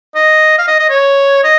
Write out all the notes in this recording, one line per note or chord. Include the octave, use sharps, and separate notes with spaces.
D#5
F5
D#5
D#5
C#5
D#5